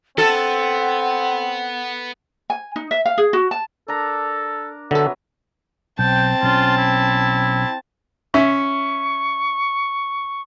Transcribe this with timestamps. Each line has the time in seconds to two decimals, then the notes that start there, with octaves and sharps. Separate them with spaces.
0.18 B3 C4 A4 F#5
2.50 G#5
2.76 D#4
2.91 E5
3.06 F5
3.18 G#4
3.33 F#4
3.51 A5
3.88 D4 A4 A#4 A#5
4.91 D3 F#3 B3 A4 E5
5.99 B1 C4 G5 A5
6.43 B1 C#4 F4
6.77 E4
8.34 C#4 E5 C#6